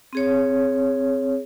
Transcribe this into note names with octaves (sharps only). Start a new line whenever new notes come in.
C4 G#4 C#5